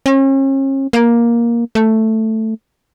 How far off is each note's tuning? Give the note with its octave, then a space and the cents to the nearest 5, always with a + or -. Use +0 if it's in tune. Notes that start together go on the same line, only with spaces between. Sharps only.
C#4 -40
A#3 +10
A3 +5